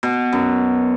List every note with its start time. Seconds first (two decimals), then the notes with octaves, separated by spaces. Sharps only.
0.03 B2
0.33 F#2